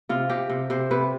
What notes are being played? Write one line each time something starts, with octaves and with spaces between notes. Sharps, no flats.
C3 F4
C3 G4
C3
C3 C5
C3 B4